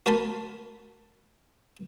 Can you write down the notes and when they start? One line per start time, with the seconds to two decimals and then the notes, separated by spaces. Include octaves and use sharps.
0.06 F#4 A#4 G#5 A5 B5 C6